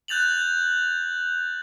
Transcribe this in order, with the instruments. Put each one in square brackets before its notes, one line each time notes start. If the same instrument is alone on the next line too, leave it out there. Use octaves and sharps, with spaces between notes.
[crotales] F#6 G6 A6 F7 F#7